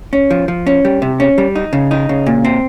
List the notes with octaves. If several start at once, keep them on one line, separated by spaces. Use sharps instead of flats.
C#4
F3
F3
C#4
G3
C3
C#4
G3
D#4
C#3
D#4
C#3
A#2
C4